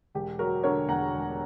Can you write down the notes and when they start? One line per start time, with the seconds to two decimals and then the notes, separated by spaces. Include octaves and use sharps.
0.15 E1 G4
0.39 F#3 F#4 A#4
0.63 D3 A#4 C#5
0.88 E2 F#5 A#5
1.14 E1